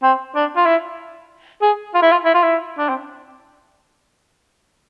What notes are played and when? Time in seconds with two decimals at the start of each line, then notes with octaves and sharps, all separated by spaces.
0.03 C4
0.35 D4
0.57 F4
0.66 E4
1.62 G#4
1.94 F4
2.02 E4
2.12 F4
2.25 E4
2.34 F4
2.43 E4
2.78 D4
2.89 C4